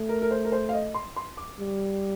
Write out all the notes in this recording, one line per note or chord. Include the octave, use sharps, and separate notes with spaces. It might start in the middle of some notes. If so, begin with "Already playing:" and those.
Already playing: A3
A#4
A#4
C5
A#4
C5
F5
D#5
C6
C6
D6
G3